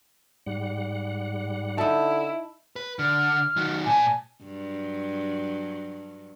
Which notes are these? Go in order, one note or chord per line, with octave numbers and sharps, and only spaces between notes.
G#2 G3 F#5
D3 D#4 E4 A5
B4
D3 F6
D#3 F#3
A#2 G#5 A5
G2 F#3